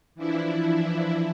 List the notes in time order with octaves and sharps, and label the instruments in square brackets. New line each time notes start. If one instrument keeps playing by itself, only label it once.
[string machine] E3 F3 D4 E4